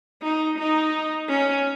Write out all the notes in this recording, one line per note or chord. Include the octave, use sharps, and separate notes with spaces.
D#4
D#4
C#4